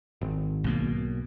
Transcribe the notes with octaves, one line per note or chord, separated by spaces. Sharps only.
G#1
B1 B2 A#3